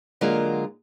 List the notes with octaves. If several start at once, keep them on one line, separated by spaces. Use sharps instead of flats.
D3 F#3 G#3 A#3 F4 A#4